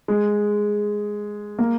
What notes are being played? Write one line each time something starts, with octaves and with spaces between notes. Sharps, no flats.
G#3
A#3